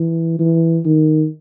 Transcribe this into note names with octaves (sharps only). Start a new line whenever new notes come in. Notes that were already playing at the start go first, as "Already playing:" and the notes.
Already playing: E3
E3
D#3